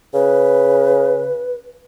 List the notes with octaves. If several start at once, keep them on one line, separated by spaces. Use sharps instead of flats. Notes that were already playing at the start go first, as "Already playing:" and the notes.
C#3 B4